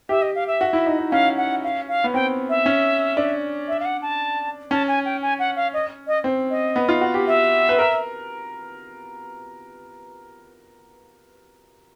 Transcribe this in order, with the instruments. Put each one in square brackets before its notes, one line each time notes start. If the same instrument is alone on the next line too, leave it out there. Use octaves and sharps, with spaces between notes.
[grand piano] G4 [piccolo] E5
[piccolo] D#5
F5
E5
[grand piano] F#4
E4
D#4
D#4
[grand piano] C#4 [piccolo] F5
[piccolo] F#5
F5
F5
[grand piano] B3
[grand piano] C4 [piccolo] G5
[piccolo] E5
[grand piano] C#4
D4
[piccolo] E5
F5
F#5
A5
[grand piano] C#4 [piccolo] A5
[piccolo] G#5
G5
G#5
F#5
F5
D#5
D#5
[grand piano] C4
[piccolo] D#5
[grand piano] B3
F4
F#4
G4
[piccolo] E5
[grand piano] B4
A#4